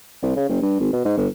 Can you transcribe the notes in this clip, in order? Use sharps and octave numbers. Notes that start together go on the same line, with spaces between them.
C2
C#3
F#1
G2
G#1
B2
G#2
G1